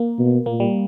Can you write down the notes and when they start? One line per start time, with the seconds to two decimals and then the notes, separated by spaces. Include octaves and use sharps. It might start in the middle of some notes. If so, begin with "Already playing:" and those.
Already playing: A#3
0.18 B2
0.46 A#2 A#3
0.60 G3